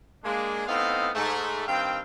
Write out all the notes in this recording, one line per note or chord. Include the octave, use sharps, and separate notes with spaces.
G#3 A#3 D4
A2 B3 C4 D#4 F5
G#2 A3
G2 D#3 C4 F5 G5